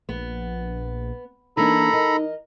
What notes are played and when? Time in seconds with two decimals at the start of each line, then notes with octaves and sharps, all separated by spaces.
0.09 A#1 B3
1.57 E3 A#3 D4 D#4 A4 A#5 B5
1.92 A#4 D#5